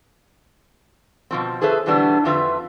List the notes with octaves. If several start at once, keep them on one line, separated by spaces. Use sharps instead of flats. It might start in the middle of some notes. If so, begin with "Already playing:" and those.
B2 F3 C4
G#4 A4 B4 C5 E5
B2 D3 E3 G3 B3 D4
F2 D3 C4 F4 B4 E5